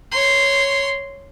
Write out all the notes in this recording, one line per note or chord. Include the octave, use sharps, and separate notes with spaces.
C#5 C6